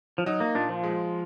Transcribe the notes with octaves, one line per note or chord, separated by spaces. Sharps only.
F3
F#3 D#4
A#3
A#2 D4
F3
G#3